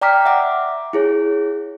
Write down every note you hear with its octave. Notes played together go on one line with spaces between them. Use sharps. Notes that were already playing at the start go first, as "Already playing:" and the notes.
D5 G5 A#5 D6 F6 B6
E5 F#5 D6
E4 G#4 C#5